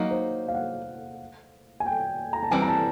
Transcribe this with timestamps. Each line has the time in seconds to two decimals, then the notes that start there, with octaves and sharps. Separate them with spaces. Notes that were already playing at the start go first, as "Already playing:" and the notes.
Already playing: F#3 A#3 D#4
0.11 C5
0.48 F5
0.54 F#5
1.80 G#5
1.86 G5
2.33 A#5
2.43 A5
2.51 E3 G3 C4 G#5
2.62 A#5
2.68 A5